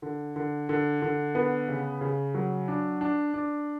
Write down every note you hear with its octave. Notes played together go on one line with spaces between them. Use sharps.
D3
D3
D3
D3
B3
C#3
C#3
F#3
D4
D4
D4